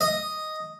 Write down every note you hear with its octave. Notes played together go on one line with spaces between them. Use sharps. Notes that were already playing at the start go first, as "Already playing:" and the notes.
D#5